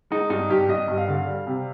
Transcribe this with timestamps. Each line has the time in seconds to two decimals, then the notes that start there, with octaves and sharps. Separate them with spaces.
0.11 G#3 D#4
0.30 G2 D#4
0.50 G2 G4
0.69 G2 D#5
0.88 G2
0.98 F5
1.08 D3
1.27 G3
1.47 C3